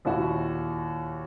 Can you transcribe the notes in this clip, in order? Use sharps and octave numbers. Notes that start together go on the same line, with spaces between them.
D#2 A#2 E4 F#4